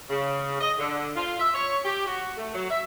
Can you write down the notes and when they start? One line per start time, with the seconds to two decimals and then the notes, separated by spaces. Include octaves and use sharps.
0.10 C#3
0.61 D#5
0.79 D3
1.16 F4
1.40 E5
1.55 C#5
1.85 G4
2.06 F#4
2.37 A3
2.55 F#3
2.70 E5